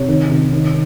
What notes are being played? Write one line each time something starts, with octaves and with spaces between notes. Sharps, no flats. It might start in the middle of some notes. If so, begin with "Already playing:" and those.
Already playing: C3 C#5
D#3
C3
D#3